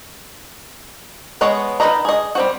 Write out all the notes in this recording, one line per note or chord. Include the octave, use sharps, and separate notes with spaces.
G#3 B3 C#5 D#5
D#3 A4 B4 D#5 A#5
G#4 D#5
G3 C4 F#4